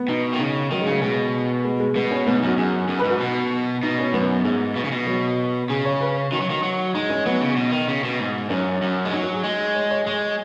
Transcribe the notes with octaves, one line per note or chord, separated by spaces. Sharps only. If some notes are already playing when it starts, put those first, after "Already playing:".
Already playing: B3
B2 D#4
D#3
C#3 D#4
D#3 F#3
G#3
C#3
F#3
B2 G#3
G#3
G#3
B2 B3
C#4
G#2 B3
D#4
F#2 F#4
F#2 G#4
F#2
B4
G#2
F#4
B2
B2 D#4
C#4
F#2 B3
G#2 G#3
B2
C#3
B2
F#3
C#3 G#4
C#5
B4
D#3 F#4
F#3
D#3
F#3
G#3 D#4
C#4
F#3 B3
C#3
B2
D#3
C#3
B2
G#2
F#2 C#4
F#2
G#3
F#3 D#4
F#4
G#4
G#3
C#5
C#5
G#3 G#4